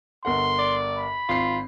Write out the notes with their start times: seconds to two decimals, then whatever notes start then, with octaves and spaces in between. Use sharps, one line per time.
0.25 G1 A#4 F#5 C6
0.58 D5
0.98 B5
1.29 G#1 F4 C7